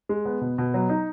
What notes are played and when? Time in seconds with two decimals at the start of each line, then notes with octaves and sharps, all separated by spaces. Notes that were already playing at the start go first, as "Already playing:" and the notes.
0.09 G#3
0.25 B3
0.41 B2
0.58 B2
0.74 F#3
0.89 D#4